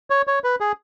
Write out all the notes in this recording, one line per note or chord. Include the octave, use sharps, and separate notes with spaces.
C#5
C#5
B4
G#4